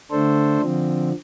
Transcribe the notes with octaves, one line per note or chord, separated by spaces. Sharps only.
D3 A3 D4 A4 C5
D3 F3 C4